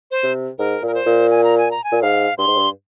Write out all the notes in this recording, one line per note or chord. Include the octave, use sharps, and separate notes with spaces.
C5
C3
G#2 A#4
A#2 A#4
C5
A#2
G#5
A#5
G#5
A#5
G#5
A#2
G#2 F5
G2 C6
G#2
G2